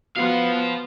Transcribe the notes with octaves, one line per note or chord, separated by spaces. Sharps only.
B3 F#4 C5 F5